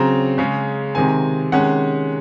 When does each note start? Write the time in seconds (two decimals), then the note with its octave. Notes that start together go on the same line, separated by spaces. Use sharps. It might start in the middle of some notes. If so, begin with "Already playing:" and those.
Already playing: C#3 F#3 C4 A#5
0.38 C#3 G#3 C#4
0.95 C3 D#3 G#3 C4 G#5
1.52 C3 D#3 G#3 C#4 F#5